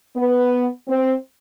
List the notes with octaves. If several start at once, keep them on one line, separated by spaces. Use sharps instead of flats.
B3
C4